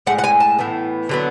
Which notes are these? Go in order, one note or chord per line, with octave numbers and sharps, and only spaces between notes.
A2 G#3 F#5
F#5
G#5
A5
A2 E3 B3
D3 F#3 B3